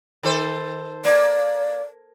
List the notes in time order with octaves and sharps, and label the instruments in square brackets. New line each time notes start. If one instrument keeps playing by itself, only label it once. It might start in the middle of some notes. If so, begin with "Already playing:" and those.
[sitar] D#3 A4 C5
[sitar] A#3 [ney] D5